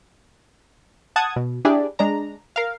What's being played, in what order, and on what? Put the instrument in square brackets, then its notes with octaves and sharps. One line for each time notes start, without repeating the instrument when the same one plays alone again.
[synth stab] F#5 A5 D#6 G#6
B2
D4 E4 G4 G#4 D5
G#3 D4 A#5
A#4 F5